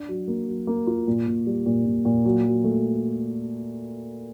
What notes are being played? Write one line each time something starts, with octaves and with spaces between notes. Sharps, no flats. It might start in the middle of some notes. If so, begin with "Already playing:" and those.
Already playing: D4
F#3
A#3
F#3
A#3
F4
A#2
A#2
G3
A#2
A#2
A#2
F#3
F#3
A3